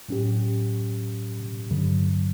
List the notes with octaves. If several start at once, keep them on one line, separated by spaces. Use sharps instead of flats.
A2 F#3 C#4 G4
G2 D3 F#3